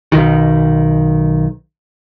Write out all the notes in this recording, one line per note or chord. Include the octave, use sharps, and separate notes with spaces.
B1 D#3